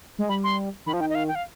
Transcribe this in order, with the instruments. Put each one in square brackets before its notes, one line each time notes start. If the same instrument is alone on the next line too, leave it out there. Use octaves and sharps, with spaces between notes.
[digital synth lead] G#3
[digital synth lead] G3 [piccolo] B5
[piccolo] C6
[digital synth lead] D#3 [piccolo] B5
[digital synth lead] F3
[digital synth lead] D#3 [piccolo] G5
[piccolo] D#5
F5
G5
F5